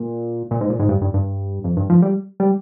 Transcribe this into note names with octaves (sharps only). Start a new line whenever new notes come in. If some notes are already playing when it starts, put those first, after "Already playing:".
Already playing: A#2
A#2
G#2
A#2
G#2
G2
G2
G2
F2
G2
F3
G3
G3